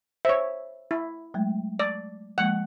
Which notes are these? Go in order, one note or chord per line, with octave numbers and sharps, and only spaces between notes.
C5 C#5 E5
E4
F#3 G#3 A3
D5
F3 G#3 A#3 F#5